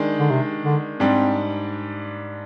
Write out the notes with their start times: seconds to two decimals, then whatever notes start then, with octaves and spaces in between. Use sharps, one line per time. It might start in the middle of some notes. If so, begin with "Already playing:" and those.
Already playing: D#3 G#3 D4
0.19 D3
0.30 C3
0.65 D3
1.00 G#2 G3 C4 D4